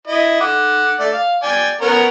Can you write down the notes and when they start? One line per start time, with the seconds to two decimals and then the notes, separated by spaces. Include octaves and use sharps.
0.07 E4 D#5
0.41 F#5 D6
1.00 A3 D5
1.13 F5
1.43 D5 G5 G#5
1.81 B3 C#4 A#4